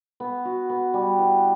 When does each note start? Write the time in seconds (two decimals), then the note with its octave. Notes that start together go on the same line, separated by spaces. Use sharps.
0.20 B3
0.45 F#4
0.70 B3
0.94 G3
1.18 E3